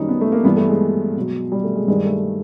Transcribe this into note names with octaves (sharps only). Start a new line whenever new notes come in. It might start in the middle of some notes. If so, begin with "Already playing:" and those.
Already playing: F#2 D#3 G3 C#4 D#4
B3
A3
A#3
G2 E3 G3 B3
A3
G#3
B2 F#3
G3
A3
G#3
G2 D#3 G3 G#3
A3